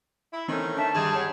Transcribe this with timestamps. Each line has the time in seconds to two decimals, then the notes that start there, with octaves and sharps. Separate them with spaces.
0.33 E4
0.48 D#3 E3 A3 C4 C#4 D#4
0.77 D4 E5 A5
0.94 G2 D3 D#3 G3 G#4
1.15 C#5 F#5